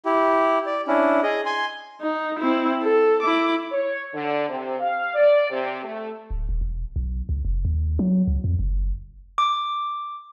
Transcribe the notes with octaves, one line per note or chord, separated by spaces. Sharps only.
E4 G4
D5
C#4 D4 E4
G#4 D#5
G#5 C6
D#4
C4 E4
A4
E4 D6
C#5
D3
C3
F5
D5
C3
A3
D1
D#1
E1
B1
C#2
F1
D#2
F#3
C#2
F2
F#1
D6